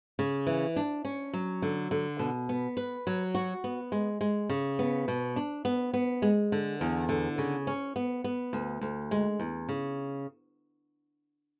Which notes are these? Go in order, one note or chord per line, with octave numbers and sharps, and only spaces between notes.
C#3
E3
D4
C#4
F#3
D3
D3
B2
B3
B4
F#3
F#4
B3
G#3
G#3
C#3
B3
B2
D4
B3
B3
G#3
D3
E2
D3
C#3
C#4
B3
B3
D2
D2
G#3
E2
C#3